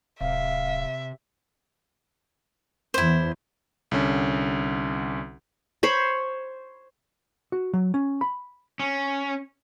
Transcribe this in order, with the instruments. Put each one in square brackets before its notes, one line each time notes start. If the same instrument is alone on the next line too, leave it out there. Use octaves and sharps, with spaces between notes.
[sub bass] D1 [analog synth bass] C3 [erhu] E5 [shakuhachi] F5
[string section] E2 [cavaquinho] E4 C5
[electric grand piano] C2 D3 C#4
[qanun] C5 C#5 B5
[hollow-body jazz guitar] F#4
F#3
C#4
B5
[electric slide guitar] C#4